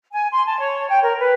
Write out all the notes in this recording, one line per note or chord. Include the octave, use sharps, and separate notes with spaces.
G#5
C6
A5
C#5
G5
A#4
B4